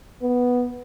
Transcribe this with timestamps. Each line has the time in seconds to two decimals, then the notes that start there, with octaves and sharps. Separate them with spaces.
0.22 B3